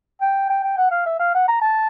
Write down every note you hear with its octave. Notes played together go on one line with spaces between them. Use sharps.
G5
G5
G5
F#5
F5
E5
F5
F#5
A#5
A5